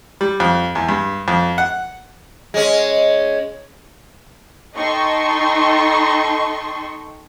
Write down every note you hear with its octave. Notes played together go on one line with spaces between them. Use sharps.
G3
F2
E2
G2
F2
F#5
G#3 C#4
D#4 A4 D#5 G5 C6 C#6